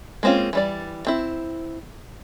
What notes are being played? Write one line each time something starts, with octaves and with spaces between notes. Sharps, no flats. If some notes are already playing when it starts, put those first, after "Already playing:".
G#3 A#3 C4 C#4 F4
E3 G3 D5
C4 E4